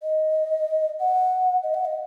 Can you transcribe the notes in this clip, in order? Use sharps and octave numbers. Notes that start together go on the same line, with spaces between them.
D#5
F#5
D#5
F#5
D#5